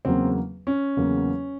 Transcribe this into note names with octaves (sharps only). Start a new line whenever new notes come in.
E2 C#3 F#3 A#3 C4
C#4
E2 C#3 F#3 A#3